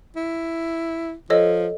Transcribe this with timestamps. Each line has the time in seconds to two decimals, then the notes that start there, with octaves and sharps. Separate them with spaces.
0.16 E4
1.30 F3 A4 C#5 D#5